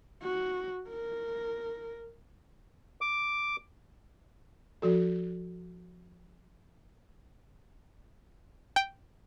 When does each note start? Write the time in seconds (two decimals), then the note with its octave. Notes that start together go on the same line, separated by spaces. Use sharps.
0.22 F#4
0.89 A#4
3.01 D6
4.82 F3 F#4 A4
8.76 G5